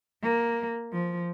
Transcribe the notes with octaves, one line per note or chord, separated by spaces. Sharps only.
A#3
F3